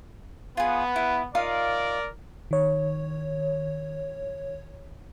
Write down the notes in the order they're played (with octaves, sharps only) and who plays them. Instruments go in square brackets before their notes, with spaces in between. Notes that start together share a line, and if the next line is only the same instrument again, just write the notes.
[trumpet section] B3 [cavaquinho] F4 G#4
[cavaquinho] E4
[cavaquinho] D#4 F4 F5 [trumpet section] A#4 D5
[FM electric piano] D#3 C#5